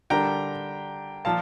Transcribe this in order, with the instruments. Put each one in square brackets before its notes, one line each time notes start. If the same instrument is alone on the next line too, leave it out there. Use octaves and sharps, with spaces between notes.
[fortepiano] D3 G3 D4 G4 A#4 [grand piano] G5 A#5
[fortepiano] A#2 F3 [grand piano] F5 A5